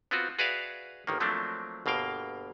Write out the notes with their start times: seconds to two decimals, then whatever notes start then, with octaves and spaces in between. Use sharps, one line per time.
0.11 B3 C4 F4 F#4
0.39 F#4 G#4 B4 D5 E5 F5
1.07 G1 D#3 A#3
1.20 F3 F#3 A3 A#3 C4 D4
1.86 G1 B2 A#3 F5 G5